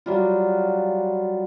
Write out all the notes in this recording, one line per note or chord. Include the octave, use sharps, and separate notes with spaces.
F#3 G3 F4